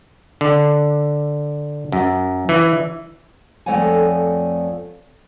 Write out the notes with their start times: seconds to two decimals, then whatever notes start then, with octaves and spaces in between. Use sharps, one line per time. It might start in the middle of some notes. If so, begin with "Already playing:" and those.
0.41 D3
1.92 F#2
2.49 E3
3.66 F2 A3 C#5 D5 F#5 G#5